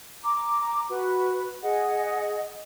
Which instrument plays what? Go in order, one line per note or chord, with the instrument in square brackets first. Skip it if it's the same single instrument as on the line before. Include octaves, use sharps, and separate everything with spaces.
[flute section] A#5 D6
F#4 B4
G#4 D#5 F#5